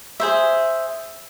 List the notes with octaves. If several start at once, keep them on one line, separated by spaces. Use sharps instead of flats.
G#4 C5 E5